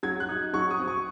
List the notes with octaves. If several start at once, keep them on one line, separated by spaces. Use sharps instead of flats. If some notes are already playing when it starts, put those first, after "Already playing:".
F#3 G#6
F#6
D#4
F#3 C#6
D#6
C4
C#6